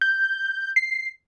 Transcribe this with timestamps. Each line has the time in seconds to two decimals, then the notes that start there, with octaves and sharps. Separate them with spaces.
0.01 G6
0.76 C7